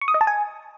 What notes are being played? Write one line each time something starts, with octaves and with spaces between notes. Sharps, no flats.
C#6
D#6
D#5
A5
G#5